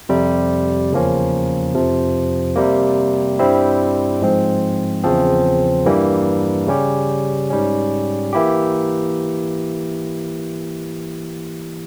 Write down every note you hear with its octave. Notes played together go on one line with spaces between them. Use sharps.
F2 C3 G3
E2 C#3 F3 A#3 C#4
F2 C3 F3
C3 G3 A#3
G2 G3 C4 E4
G#2 F3 G#3 C4
E2 C#3 F3 C4
G2 E3 G3 A#3
C#3 G3 C#4 G4
G#2 G3 C#4
E3 A#3 E4 G4